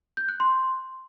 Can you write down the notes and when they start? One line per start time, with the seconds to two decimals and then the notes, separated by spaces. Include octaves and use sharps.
0.17 G6
0.29 F#6
0.40 C6